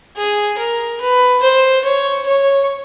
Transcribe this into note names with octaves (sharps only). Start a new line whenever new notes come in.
G#4
A#4
B4
C5
C#5
C#5